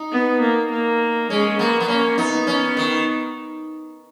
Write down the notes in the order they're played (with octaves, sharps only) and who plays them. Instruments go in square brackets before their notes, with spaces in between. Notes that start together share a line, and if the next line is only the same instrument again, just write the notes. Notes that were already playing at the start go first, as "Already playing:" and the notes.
Already playing: [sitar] D#4
[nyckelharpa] B3
A#3
A#3
[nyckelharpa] G#3 [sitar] C#4
[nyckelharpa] A#3 [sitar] B3
[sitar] B3
[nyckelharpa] A#3 [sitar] C#4
[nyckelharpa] B3 [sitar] D#4
[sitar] C#4
D#3